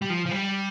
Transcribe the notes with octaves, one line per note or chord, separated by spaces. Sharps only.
G3
F3
F3
G3